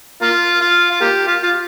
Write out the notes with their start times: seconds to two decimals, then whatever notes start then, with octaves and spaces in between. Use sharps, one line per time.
0.22 A#3 F4
0.61 F4
0.91 F4
1.01 A#3 G4
1.27 F4
1.43 F4